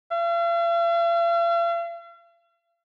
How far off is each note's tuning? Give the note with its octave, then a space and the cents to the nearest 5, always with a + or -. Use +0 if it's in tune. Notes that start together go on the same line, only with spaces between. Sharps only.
F5 -45